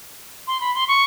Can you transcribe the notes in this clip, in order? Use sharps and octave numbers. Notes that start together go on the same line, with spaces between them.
C6
B5
C6
C#6